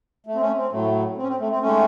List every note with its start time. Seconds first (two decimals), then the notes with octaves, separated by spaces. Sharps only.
0.27 A3
0.35 C4
0.41 A3 C#4
0.57 C4
0.71 A2 F#3 A3
1.17 C4
1.23 C#4
1.28 C4
1.40 A3
1.51 C4
1.62 D#3 G#3 A3 C#4